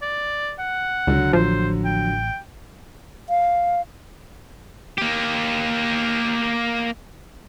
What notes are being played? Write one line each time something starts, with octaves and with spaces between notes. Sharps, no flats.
D5
F#5
C#2 D3 F#3
A1 F3 C5
G5
F5
A#3 G4